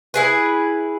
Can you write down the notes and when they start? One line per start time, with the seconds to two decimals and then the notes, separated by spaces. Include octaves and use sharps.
0.14 E4 G#4 B4